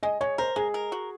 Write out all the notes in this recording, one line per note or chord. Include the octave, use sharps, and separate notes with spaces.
G#3 D#5
G#3 C#5
A#4 C5
G#3 G#4
A#4
F#4